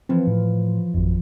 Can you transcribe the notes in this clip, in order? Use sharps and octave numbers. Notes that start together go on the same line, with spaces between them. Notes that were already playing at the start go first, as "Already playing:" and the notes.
E3 F3 C4
A2
G#1 F2